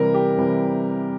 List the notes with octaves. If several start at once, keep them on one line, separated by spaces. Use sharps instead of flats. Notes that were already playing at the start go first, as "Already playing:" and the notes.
Already playing: C3 E3 G3 A#4
G4
C3 E3 G3